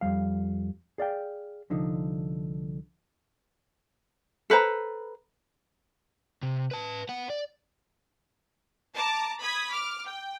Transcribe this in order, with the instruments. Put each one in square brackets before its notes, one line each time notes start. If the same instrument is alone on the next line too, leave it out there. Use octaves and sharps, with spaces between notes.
[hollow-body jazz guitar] F2 G#2 G3 F5
G#4 D5 F5 G5
C2 D3 F3 D#4
[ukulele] A4 B4 C5 A#5
[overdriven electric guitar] C3
B4 A5
B3 F#5
D5
[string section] A5 A#5 D6
B5 D#6 G#6 B6
D6 F6
G5